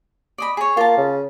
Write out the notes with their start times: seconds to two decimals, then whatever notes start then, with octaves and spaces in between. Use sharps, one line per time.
0.38 D5 D#5 B5
0.57 G#4 C#5
0.77 A#3 F4 A5
0.97 C#3